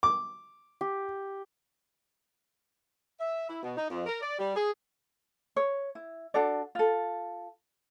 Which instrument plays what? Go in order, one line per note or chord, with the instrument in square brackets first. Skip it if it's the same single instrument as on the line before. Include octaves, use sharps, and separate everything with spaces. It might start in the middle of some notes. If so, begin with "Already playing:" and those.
[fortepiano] D6
[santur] G4
[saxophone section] E5
E4
B2
D#4
F2
A#4
D5
G3
G#4
[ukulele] C#5
E4
D4 F#4 A4 D5
F4 A4